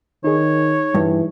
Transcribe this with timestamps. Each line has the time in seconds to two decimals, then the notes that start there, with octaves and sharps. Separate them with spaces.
0.24 D#3 D#4 G#4 C#5
0.95 G2 E3